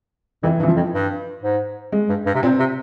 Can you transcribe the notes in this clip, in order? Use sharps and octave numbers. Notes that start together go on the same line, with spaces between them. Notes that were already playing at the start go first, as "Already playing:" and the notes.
F2 E3
G2
E3
F3
F2
G2
G#2
G#3
G2
G2
C3
A#2 C4
C3